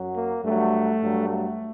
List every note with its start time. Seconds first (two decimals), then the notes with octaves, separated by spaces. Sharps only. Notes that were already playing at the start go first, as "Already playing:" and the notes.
Already playing: F#2 F#3
0.17 A#3
0.45 G2 F#3 A3
1.02 G2 F#3
1.30 A3